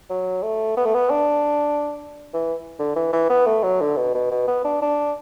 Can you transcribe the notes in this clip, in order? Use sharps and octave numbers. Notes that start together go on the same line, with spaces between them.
F#3
A3
B3
A3
B3
D4
E3
D3
E3
E3
B3
A3
F#3
D3
B2
B2
B2
B3
D4
D4